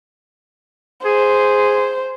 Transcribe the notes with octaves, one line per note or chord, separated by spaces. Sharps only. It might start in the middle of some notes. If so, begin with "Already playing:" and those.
G#4 C5